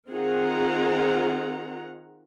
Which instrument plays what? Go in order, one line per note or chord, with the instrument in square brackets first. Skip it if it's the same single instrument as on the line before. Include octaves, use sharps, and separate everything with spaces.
[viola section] D#3 C4 F4 G#4 F#5 A#5